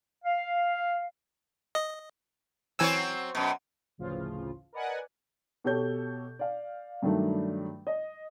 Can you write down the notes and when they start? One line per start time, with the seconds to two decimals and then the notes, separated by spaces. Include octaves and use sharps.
0.25 F5
1.75 D#5
2.79 E3 F#3 C4 C#5 G#5 E6
3.35 F#2 B2
3.98 A1 D2 C#3 E3 F3 F4
4.73 A#4 B4 D5 D#5 F#5 G#5
5.64 B2 G4 A4 C#5 G6
6.39 D5 F5
7.02 G2 D#3 F#3 A3 D4
7.87 D#5